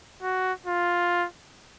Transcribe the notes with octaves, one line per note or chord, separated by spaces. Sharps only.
F#4
F4